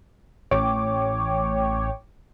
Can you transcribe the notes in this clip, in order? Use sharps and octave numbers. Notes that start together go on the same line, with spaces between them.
A1 C#5 G5 D6